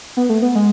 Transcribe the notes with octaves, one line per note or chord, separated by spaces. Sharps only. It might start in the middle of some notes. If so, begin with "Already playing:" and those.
B3
A3
B3
G#3